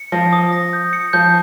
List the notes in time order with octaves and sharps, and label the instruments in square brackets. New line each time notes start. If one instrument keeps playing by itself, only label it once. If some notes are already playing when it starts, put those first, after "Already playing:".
Already playing: [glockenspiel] C#7
[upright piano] F3 [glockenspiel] A#6
[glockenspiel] D#6
A#6
G6
C#7
[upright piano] F3 [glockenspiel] G6